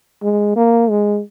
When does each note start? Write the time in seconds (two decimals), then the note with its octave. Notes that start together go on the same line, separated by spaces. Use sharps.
0.23 G#3
0.56 A#3
0.90 G#3